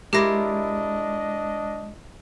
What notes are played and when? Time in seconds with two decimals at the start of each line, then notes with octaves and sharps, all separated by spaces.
0.13 G#3 D4 E4 F4 G4 A#4 D#5 A#6